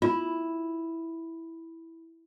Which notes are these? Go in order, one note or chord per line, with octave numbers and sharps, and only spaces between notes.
E4 F4